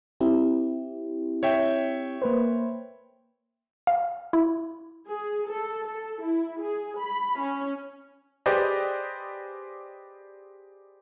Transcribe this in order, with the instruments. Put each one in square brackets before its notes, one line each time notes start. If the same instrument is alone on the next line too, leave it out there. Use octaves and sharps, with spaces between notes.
[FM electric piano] C4 E4 G4
[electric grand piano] C#5 E5 G5
[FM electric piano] A#3 B4 C5
[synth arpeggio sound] F5
E4
[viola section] G#4
A4
A4
E4
G#4
B5
C#4
[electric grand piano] G4 G#4 B4 C5 D5 D#5